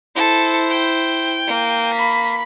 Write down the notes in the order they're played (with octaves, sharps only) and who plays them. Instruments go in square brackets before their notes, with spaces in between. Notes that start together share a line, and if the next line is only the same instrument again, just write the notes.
[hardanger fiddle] E4 C5 [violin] A4
[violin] G5
[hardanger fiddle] A#3
[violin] B5 B6